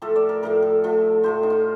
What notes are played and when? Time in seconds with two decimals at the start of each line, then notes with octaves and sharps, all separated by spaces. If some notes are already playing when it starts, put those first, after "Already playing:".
0.02 A2 F3 A3 A4
0.16 D5
0.29 A#4
0.43 A2 F3 A3 A#4
0.62 A4
0.84 A2 F3 A3
1.24 A2 F3 A3 C5
1.43 D#4
1.50 F4